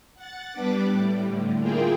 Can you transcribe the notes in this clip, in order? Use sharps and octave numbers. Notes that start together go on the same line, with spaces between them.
F#5 A6
G3 B3 D4 B4 D6
A2 G3
A2 D3
A#3 E4 F4 G#4 A#4 G5